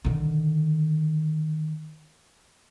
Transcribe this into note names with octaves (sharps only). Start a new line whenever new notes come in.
D3 D#3